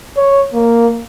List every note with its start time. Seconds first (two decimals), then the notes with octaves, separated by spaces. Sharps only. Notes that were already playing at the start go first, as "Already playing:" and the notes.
0.17 C#5
0.54 A#3